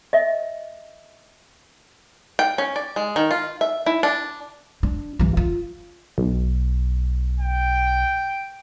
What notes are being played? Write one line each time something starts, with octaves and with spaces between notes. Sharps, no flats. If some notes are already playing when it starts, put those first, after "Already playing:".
D#5 E5
G5
C#4
D5
G#3
D#3
F4
E5
E4
D4
D4
G2 E3
F4
B1
G5